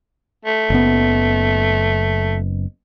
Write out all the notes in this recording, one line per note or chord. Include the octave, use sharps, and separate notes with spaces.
A3
F#1 B3